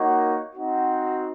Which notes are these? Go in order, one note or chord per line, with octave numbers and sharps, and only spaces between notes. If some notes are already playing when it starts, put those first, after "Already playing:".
Already playing: A#3 D#4 F#4 C#5 F#5
C4 D#4 F#4